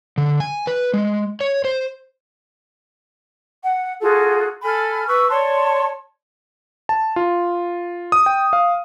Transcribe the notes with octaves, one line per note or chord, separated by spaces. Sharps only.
D3
G#5
B4
G#3
C#5
C5
F#5
F4 F#4 G#4 A4
A4 G#5 B5 F6
B4 C#6 E6
C#5 D5 A5 C6
A5
F4
D#6
G5
F5